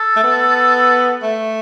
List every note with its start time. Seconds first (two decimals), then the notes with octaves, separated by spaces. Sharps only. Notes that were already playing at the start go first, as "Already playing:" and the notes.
Already playing: A4
0.16 A3
0.24 B3
1.23 A3